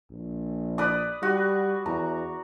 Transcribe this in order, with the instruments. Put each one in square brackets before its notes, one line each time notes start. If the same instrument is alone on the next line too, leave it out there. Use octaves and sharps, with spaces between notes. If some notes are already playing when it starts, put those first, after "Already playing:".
[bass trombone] A#1
[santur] B4 D5 D#6
[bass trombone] G3 [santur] F#4
[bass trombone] E2 [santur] A#5